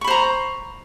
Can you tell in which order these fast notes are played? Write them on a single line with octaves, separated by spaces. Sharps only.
C#6 B5 C5 A#5